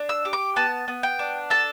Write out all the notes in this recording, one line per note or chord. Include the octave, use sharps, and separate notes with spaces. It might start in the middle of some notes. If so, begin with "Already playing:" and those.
Already playing: D4
E6
G4
D6
B3 A5
B3
G5
D4
A4 A5